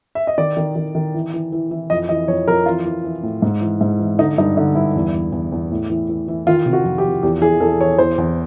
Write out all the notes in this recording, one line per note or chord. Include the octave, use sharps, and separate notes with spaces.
E5
D#5
D#3 D5
D#3
D#3
D#3
E3
E3
E3
E3
F2 D#5
E3 D#5
F2 C#5
F2 A#4
E3 F4
E3
E3
A2
G#2
E3
G#2
E3
D3 D#4
G2 D#4
D3 D#4
G2 E4
E2
E2
E2
E2
A2
E3
E3
E3
D#3 F4
C3
F#4
F2
G4
F2
E2 G4
E3 G#4
E2 A4
E3 C#5
E2 C5
E2